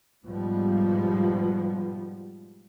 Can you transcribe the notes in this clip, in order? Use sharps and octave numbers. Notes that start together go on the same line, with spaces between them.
G#2 B2 F3 G3